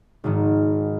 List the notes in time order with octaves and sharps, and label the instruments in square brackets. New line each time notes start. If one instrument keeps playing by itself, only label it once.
[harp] G#1 G#2 D#3 G#3